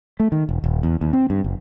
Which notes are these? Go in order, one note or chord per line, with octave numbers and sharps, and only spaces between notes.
A3
D#3
E1
D#1
E2
D#2
C4
G2
F#1